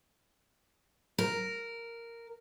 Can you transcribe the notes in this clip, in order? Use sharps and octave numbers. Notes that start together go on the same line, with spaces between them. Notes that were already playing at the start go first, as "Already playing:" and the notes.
A#4